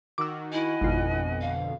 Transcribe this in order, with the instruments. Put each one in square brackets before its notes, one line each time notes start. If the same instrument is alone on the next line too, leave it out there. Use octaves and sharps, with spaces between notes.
[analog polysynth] D#3 F#4 [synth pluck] D6 E6
[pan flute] E4 [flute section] D#5 F#5 G#5
[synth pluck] G#1 F4 [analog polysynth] F2 B2 D3
[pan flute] F5